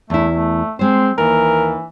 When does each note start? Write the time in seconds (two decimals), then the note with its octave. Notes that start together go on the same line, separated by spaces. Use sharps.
0.10 E2 A3 E4
0.32 A3
0.79 G#3 C4 C5
1.18 D#2 E3 A#4